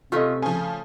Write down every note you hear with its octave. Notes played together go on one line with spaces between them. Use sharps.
C3 A3 C#4 E4 F4 D#5
C#3 F3 G#5